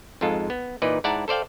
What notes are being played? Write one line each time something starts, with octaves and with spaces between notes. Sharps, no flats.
F2 G#2 G#3 F4 A4
B3
A#2 E3 D#4 B4 D5
G#2 E4 D5 F#5 A5 A#5
A4 C5 D5 F5 G5